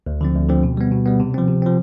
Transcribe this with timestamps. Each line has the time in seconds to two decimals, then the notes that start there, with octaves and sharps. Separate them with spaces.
0.07 D2
0.21 D3 F3 C4
0.35 D2
0.49 D3 F3 C4
0.63 B2
0.77 G3 B3
0.92 B2
1.06 G3 B3
1.20 C3
1.34 F3 C4
1.48 C3
1.62 F3 C4